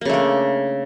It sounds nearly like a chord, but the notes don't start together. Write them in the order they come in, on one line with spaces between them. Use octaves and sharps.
A#3 C#3 A3 D4